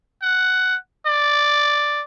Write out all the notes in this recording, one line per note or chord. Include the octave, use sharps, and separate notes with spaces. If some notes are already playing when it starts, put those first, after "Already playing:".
F#5
D5